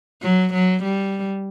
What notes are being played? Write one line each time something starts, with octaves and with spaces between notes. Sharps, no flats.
F#3
F#3
G3